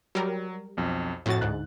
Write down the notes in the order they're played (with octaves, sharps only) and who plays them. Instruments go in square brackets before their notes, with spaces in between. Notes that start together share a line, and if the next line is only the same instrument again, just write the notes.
[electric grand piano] F#3 [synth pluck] G3 A#4
[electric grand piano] B1 F2
[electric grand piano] F2 F#4 [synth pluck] A2 A6
[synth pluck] D2 G#2 [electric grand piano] F#6